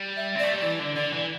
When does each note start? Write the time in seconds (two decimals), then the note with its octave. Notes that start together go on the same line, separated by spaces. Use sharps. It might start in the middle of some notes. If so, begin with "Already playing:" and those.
Already playing: G3
0.17 E5
0.35 C4
0.39 D5
0.44 A3
0.53 G3
0.61 E3 D5
0.79 D3
0.96 D3 D5
1.13 E3